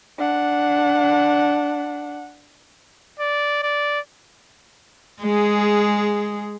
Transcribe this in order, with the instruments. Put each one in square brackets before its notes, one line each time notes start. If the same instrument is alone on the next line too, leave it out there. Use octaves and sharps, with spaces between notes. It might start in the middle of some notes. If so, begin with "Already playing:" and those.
[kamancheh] D4 F#5
[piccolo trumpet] D5
D5
[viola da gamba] G#3 G#4